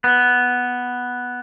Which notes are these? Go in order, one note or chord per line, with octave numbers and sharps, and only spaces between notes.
B3